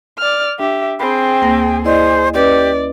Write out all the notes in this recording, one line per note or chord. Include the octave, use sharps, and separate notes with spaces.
D5 F6
D4 G4 E5
C4 G#4 G5 B5
D2 A#3 A#6
E4 G#4 C5 D5 D#5
C#4 G4 B4 D5 D#5